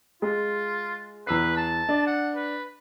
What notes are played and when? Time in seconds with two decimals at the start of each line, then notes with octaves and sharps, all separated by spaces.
0.22 G#3 F4
1.27 E2 B4 E6 C7
1.57 A5
1.89 D4
2.07 F#5
2.35 B4